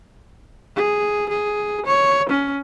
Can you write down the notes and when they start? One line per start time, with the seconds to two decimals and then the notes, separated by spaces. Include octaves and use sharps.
0.77 G#4
1.29 G#4
1.86 C#5
2.29 C#4